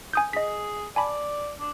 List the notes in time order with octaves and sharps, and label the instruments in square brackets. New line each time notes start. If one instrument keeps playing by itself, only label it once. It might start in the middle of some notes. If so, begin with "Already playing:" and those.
[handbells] G#5 D#6 G6
[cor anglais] G#4 [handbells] D#5 B6
[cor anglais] D5 [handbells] G#5 A5 B5
[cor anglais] D4